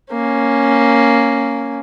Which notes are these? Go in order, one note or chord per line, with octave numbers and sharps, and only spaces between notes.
A#3 C#4